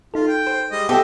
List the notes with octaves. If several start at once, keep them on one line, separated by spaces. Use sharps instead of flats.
D#4 F4 A4
G5
C5
G3 G#3 D#5
B3 C4 F4 G4 A4 D#5 E5